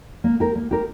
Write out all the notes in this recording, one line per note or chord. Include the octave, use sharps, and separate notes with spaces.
A#3
G4 A#4
A#3
G4 A#4